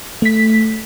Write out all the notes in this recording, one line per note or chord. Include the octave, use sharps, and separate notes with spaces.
A3 B6